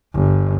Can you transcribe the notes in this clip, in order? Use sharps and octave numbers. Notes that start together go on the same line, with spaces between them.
G1